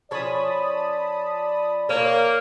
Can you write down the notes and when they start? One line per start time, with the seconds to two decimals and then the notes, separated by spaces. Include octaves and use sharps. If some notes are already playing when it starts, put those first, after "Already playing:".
0.11 F3 C#4 C#5 D5 A5 B5 D#6
1.89 A#3 C#5